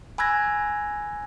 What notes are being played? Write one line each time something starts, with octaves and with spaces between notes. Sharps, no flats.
G#5 B5 E6 F#6 G#6 A#6